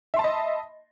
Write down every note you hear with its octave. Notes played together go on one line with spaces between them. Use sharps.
D#5 E5 A5 B5 C6